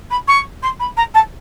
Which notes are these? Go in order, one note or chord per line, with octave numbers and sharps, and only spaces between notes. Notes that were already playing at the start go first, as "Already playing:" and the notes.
B5
C#6
C6
B5
A#5
A5